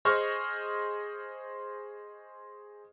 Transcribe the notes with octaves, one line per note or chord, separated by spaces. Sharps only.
G#4 C5 D#5 C#6 D#6 F6